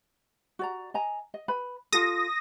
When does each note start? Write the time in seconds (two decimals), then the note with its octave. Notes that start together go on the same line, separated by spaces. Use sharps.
0.59 F#4 D5 A#5
0.94 D#5 G#5 A#5
1.34 D#5
1.48 B4 B5
1.93 F4 A4 D#6 A#6